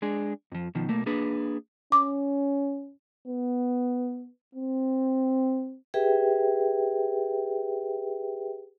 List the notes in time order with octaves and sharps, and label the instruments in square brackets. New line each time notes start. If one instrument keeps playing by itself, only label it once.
[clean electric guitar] G#3 D4 G#4
F2 F3
B2 D#3 F3
B1 A3 A#3
A#3 D4 G#4 B4
[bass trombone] C#4 [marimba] D6
[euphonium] B3
C4
[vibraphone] G4 G#4 B4 E5 G5